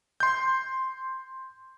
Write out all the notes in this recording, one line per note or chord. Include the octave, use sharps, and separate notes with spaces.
C6 G6